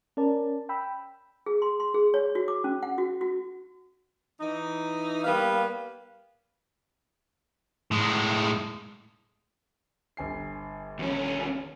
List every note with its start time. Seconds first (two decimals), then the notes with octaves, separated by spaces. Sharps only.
0.17 C#4 A#4 D5 A5
0.69 G5 B5 E6
1.46 G#4
1.62 C6
1.80 C6
1.94 G#4
2.14 C#5
2.35 F#4
2.48 D6
2.64 C#4
2.83 F#5
2.98 F#4
3.21 F#4
4.40 E3 D#4
5.24 G3 A#3 B3 B4 F5
7.91 A2 G#3
10.17 G1 G#5 C7
10.99 D#2 C#4